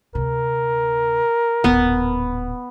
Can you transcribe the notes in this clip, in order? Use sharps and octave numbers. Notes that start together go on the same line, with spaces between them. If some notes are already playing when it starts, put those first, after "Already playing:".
D2 C3 A#4
D#1 A1 B3